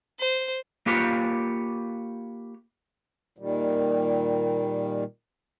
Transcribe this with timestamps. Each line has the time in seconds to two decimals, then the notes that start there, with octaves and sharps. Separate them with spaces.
0.19 C5
0.86 A#3 F4 G4 B4 C#5
3.38 A#2 D#3 G3